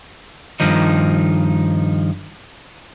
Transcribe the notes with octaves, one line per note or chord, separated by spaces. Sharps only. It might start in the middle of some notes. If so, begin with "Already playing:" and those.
G2 D#3 F3 D#4